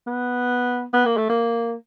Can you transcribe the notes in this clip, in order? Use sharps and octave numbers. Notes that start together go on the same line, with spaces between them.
B3
B3
A#3
A3
A#3